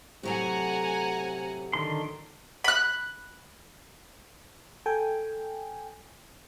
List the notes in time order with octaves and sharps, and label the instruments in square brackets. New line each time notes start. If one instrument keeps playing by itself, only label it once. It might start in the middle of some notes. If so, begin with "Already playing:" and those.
[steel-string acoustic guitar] A2 F#3 A3 [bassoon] C3 [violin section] F#5 G#5 A#5
[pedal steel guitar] D3 D#3 C6
[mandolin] B5 F#6
[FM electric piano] A4 G5 G#5